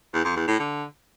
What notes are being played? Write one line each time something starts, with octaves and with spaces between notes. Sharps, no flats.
E2
F2
E2
A2
D3